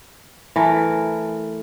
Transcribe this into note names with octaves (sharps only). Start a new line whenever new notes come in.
E3 A3 A#4